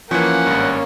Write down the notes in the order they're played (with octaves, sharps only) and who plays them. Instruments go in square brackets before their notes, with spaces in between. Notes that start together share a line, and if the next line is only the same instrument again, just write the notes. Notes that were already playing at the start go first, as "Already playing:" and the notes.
[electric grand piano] E3 F3 [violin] A#3 C#5 [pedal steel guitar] C#4 [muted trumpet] F#5
[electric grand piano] G#1 G2